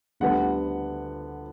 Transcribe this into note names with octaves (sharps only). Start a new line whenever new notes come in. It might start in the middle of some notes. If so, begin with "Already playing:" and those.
D2 D3 G3 B3 F#5